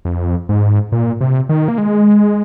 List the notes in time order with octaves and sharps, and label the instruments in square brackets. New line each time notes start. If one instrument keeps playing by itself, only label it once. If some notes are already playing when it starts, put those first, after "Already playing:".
[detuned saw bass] F2
G#2
A#2
C3
D#3
A#3
G#3